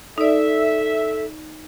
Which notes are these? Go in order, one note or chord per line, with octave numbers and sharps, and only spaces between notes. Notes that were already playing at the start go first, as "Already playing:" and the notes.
D#4 A4 D5 E5